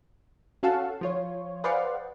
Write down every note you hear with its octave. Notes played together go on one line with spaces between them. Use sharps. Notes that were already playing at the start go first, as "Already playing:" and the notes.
C#4 F#4 A4 F5 F#5 A5
F3 F4 C#5
G#4 B4 C5 D5 F5 F#5